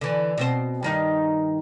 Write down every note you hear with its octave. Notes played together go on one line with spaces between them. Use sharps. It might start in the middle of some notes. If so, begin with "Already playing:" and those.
D3 E3
B2 C4 C5
G2 D#3 D#4